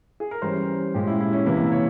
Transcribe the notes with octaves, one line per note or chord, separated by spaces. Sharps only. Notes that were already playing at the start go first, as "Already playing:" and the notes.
G#4
A#4
E3 G3 C#4 C5
A#2 G#3 C#4 G4
E4
E4
C#4
C3 E3 A#3 E4
C#5